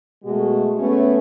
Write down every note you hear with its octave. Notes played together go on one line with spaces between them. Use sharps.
B2 G#3 A3 F#4
A3 B3 C#4